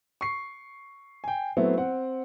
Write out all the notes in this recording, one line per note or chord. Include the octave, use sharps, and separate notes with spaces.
C#6 C7
G5 G#5
F#3 A3 B3 C4 E4
C4 F#5